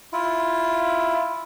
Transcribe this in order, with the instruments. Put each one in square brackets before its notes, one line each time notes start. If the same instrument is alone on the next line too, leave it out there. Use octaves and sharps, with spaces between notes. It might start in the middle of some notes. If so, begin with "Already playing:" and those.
[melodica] E4 F4